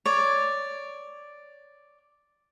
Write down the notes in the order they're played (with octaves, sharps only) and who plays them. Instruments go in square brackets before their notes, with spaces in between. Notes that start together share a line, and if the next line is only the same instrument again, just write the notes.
[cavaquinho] C#5 D5